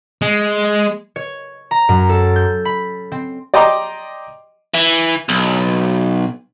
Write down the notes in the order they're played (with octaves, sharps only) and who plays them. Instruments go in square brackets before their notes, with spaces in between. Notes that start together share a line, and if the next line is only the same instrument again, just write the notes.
[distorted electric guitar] G#3
[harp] C#5
A#5
F#2
A4
G6
B5
C4
[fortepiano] D5 D#5 G5 A#5 C6 D6
[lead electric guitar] E3
B1